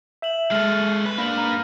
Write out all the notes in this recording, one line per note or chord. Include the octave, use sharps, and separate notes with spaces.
E5 G6 E7 F#7
G#3 A4 F6 D#7 F#7
B4
A#3 D4 B4 A#6 F#7
A#5